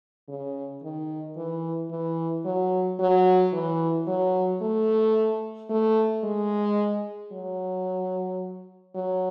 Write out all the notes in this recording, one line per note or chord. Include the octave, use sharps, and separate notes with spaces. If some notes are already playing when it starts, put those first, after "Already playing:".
C#3
D#3
E3
E3
F#3
F#3
E3
F#3
A3
A3
G#3
F#3
F#3